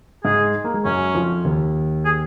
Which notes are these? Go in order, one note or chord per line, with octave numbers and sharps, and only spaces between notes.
G#2 G#3 G#4
A#3
G#3
F#2 F#3 C#4
F2 F3
D#2 D#3
G#4